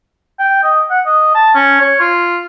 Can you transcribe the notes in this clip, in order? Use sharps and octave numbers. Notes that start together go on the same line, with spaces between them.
G5
D#5
F#5
D#5
A5
C#4
C#5
F4